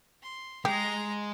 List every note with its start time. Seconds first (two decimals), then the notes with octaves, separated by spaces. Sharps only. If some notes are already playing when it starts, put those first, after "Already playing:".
0.22 C6
0.65 G#3 G4 D#5 A#5